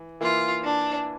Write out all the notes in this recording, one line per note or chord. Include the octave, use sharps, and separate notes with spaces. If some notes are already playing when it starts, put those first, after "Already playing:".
Already playing: E3
E3 A#3 E4 F4
D4